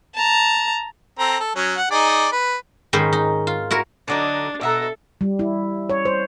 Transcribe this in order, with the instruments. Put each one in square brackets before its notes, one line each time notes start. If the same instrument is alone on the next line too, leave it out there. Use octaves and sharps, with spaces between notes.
[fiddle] A5 A#5
[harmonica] C4 A4 A#5
A4
F#3 C#4
F#5
D#4 G#4 D5
B4
[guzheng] G#2 D#3 C#4 D#4 B4 C5
D#4
F4
E4 F#4 A#4
[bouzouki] D3 F#3 D#4 [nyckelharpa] D4
[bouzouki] B2 F#5 A#5 [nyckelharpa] A4 E5
[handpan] G3
E4
C#5
C5